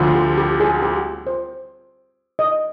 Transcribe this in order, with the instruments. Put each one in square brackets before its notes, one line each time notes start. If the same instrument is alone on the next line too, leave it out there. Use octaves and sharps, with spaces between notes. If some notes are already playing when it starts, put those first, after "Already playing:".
Already playing: [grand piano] D2 D3 F3
[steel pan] G4
G4
G#4
G4
C5
D#5